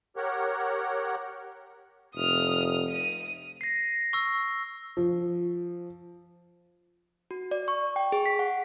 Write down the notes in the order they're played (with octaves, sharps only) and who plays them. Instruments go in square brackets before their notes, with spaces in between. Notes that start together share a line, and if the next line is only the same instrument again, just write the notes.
[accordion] G4 A#4 C#5 F#5
[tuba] F1 [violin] D#6 F6
[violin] D#7
[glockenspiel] A#6 C7
C#6 E6
[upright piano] F3
[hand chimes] F#4
D5
C#6
G5
G#4
B6
F#5